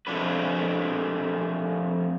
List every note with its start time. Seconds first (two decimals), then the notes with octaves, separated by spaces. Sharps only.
0.07 F2 F3 A3 D4 B4